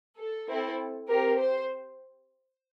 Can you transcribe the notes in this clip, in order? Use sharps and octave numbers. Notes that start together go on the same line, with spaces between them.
A4
C4 E4 A4
C4 G4 A#4
C5